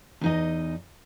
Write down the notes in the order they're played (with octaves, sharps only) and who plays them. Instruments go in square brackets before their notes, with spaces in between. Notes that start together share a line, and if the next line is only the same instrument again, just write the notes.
[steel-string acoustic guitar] E2 D#4 D#5